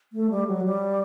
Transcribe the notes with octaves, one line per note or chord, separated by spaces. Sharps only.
A3
G3
F#3
G3